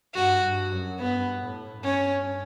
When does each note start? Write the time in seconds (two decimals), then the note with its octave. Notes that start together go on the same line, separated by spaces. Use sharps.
0.15 G2 F#4
0.43 G2
0.71 F#2
1.00 G2 B3
1.42 A2
1.85 G2 C#4